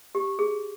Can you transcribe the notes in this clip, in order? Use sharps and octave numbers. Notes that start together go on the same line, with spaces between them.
G4
G#4